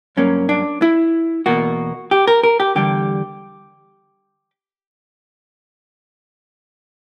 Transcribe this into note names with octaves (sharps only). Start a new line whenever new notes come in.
G2 F#3 A#3 C#4
D4
E4
E2 B2 A#3 F#4
G4
A#4
A#4
G4
E2 D3 G3 G4